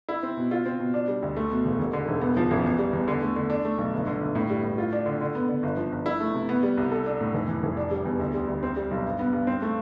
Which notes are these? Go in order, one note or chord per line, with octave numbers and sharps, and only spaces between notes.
E4
C4
B2
F4
C4
B2
D4
G3
D2
A3
B2
E1
E1
D3
E1
B3
F3
A1
E2
G3
E2
D3
A3
D3
D4
A3
B1
G1
D3
G1
A2
G3
A2
F4
D4
D3
D3
B3
D3
G1
F3
G1
E4
A3
C3
B3
G3
C2
A4
D4
A2
F1
E3
F1
D4
G3
E2
D2
G3
D2
C4
G3
B1
G2
B3
G2
C4
A3